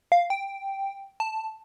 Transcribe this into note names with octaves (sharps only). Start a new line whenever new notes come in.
F5
G5
A5